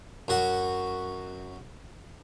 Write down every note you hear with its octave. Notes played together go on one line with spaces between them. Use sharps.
F#2 F#4